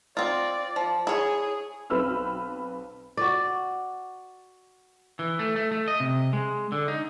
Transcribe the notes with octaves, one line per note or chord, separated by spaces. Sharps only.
C4 F4 D5
F3
E4 G#4 C#5
B1 C4 B4 B5 E6 F6
F#4 D5
E3
A3
A3
A3
D#5
C3
G#3
D3
D#4